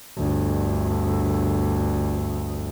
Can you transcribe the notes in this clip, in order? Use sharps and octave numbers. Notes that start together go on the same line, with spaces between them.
G1 D2